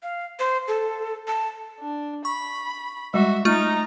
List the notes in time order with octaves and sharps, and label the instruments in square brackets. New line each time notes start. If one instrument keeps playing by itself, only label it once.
[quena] F5
C5
A4
A5
[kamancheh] D4
[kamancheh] B5 [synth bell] C#6
[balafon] G3 G#3 [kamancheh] F#4 E5
[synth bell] A3 F4 F6 [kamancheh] D#4 A#5